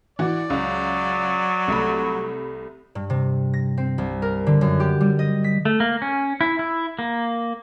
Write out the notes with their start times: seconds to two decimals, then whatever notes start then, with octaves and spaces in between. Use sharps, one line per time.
0.19 E3 F#4 D5
0.50 C#2 F#3
1.68 C2 A3 B5
2.95 G2
3.10 C3
3.54 A#6
3.77 C4
3.98 C2
4.22 A#4
4.47 D3
4.61 F#2
4.80 G4
5.01 G3
5.19 D#5
5.44 B6
5.65 A3
5.80 A#3
6.02 C#4
6.41 E4
6.59 E4
6.99 A#3